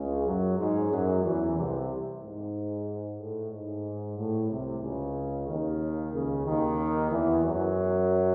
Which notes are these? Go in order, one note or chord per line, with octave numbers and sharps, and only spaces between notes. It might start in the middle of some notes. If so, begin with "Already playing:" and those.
Already playing: C#2 C#3
F#2 F#3
G#2 G#3
F#2 F#3
E2 E3
C2 C3
G#2
A2
G#2
A2
C2 C3
C#2 C#3
D#2 D#3
C#2 C#3
D#2 D#3
E2 E3
F#2 F#3